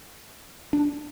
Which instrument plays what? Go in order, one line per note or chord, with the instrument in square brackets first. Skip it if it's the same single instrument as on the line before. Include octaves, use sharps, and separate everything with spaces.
[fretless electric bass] D4